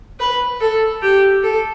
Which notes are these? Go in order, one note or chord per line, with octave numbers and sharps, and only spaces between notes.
B4
A4
G4
A4